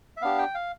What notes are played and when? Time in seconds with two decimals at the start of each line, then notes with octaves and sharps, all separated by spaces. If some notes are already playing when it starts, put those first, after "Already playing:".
0.17 E5
0.21 B3 D4 G4 F5
0.38 G5
0.55 F5